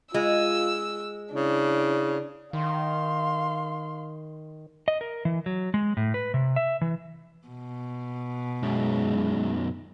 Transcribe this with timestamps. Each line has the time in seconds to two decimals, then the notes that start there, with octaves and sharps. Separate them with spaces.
0.14 G#3 F4 E6
1.34 C#3 D4 E4
2.53 D#3 F5 C6
4.88 D#5
5.01 A#4
5.25 E3
5.46 F#3
5.74 G#3
5.97 A2
6.14 B4
6.34 C3
6.56 E5
6.81 E3
7.47 B2
8.63 B1 F#2 G#3